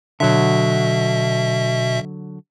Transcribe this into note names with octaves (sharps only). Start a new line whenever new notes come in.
B2 D3 F#3 E5